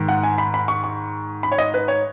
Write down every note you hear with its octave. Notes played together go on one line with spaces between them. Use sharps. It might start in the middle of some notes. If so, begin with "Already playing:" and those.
Already playing: G#2 D#3
F#5
G#5
B5
B5
C#6
C#6
B5
C#5
D#5
B4
C#5